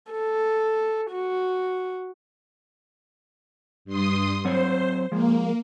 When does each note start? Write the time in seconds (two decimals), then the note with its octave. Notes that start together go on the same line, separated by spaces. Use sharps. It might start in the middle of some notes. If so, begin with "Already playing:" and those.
0.12 A4
1.11 F#4
3.85 G2 C6 D#6
4.45 F#3 C4 C5 C#5
5.12 F3 G#3 A#3